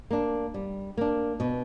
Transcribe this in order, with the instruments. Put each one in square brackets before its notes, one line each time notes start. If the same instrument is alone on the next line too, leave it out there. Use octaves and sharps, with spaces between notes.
[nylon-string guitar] A#3 D4
G3
A#3 D4
B2